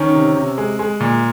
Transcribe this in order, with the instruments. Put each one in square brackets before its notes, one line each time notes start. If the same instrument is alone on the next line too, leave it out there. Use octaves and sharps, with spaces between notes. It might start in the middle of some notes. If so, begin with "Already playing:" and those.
Already playing: [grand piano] D#3 C#4
C3
C3
G#3
G#3
A#2